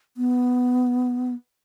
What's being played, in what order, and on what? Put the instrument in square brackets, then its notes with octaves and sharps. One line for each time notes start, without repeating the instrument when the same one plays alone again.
[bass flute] B3